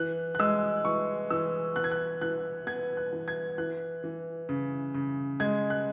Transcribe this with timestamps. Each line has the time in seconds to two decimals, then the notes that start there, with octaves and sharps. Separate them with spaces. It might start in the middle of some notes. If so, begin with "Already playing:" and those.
Already playing: E3 F#6
0.35 F#6
0.39 G#3 E6
0.85 E3 C#6
1.30 E3 E6
1.76 B3 F#6
1.84 G#6
1.92 F#6
2.21 E3 F#6
2.67 B3 G#6
2.97 F#6
3.13 E3
3.28 G#6
3.58 E3 F#6
4.04 E3
4.49 C#3
4.94 C#3
5.40 G#3 G#6
5.70 F#6